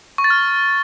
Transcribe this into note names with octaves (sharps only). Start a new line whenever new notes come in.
C#6
A6
F6